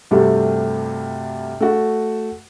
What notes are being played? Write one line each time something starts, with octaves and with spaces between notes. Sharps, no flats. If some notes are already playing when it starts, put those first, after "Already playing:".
G2 C3 G3 A3 F#4
A3 F#4